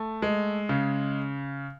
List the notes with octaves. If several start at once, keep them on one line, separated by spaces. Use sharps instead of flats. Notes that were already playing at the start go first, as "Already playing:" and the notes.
Already playing: A3
G#3
C#3